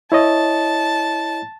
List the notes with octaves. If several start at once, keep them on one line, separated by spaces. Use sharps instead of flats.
E4 C#5 D#5 A5